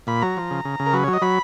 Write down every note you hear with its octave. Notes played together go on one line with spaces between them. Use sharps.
A#2 B5
F#3 A#5
F3
C#3
C#3
C#3
A#4
F#3 B4
F#3 C#5
D#5
F#3 B5